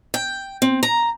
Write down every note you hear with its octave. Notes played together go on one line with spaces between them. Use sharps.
G5
C4
A#5